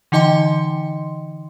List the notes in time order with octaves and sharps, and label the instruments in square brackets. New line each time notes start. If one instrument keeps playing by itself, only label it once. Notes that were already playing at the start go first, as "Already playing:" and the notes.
[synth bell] D3 E3 D#4 D#5 G5 C6